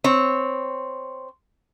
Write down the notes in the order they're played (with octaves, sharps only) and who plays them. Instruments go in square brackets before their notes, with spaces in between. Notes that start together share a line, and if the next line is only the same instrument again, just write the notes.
[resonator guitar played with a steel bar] C4 C#5